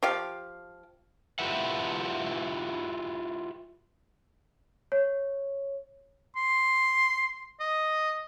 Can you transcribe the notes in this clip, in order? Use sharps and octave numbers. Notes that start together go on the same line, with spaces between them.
F3 G4 F5
E4 F4 G4 B4 E5 F#5
C#5
C6
D#5